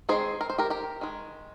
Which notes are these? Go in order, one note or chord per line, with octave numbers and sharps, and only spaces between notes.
D#3 G#3 C4 G#4 C5
A#4
C5
G4 A#4
G4 A#4
D#3 G#3